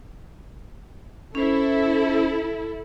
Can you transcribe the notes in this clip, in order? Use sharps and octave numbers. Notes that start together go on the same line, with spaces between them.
C#4 E4 A4 C5